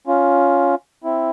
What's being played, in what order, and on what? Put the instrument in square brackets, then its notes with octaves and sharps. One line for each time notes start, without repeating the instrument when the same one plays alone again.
[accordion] C#4 F4
C4 E4